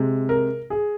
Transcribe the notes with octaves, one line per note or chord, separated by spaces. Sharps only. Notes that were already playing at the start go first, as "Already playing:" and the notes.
Already playing: C3 G#3
A#4
G#4